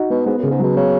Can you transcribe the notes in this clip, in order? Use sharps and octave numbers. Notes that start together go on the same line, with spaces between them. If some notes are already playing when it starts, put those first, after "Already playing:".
Already playing: D#4 F#4
B2 B3
G#2 B3
F#2
C#3
G#2
B2 F#3
C#3 B3